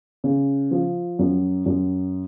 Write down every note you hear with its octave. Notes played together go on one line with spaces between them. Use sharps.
C#3
F3
F#2
F#2